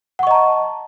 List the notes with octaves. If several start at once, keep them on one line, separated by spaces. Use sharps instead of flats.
D#5 F#5 A5 A#5 C#6